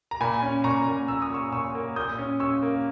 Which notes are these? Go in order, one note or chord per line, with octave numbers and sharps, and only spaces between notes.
A#5
A#2 G#5 B5
C#4
A#2 A#5 C#6
A#2
A#2 E6
D#6
A#2 C#6 E6
A#2 C#6 E6
A#3
A#2 D#6 G6
C#4
C#4 C#6 E6
A#3